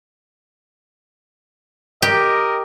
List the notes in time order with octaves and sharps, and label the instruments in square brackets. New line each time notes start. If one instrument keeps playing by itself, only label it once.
[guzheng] G4 [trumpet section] A#4 D#5